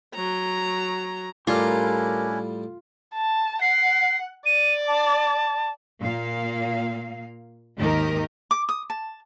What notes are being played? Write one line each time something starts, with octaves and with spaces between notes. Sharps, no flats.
F#3 A#5
A2 G3 C#4 D4 E4 F4 G4 A#4
A5
F#5 C7
D5 D#7
A5
A#2 A#3 F5
D#2 G#2 D#3 G4 A#4 D#5
D6
D#6
A5